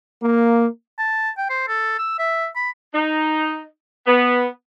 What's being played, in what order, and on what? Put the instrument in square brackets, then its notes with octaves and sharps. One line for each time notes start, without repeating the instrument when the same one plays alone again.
[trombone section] A#3
[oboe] A5
G5
C5
A4
E6
E5
B5
[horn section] D#4
B3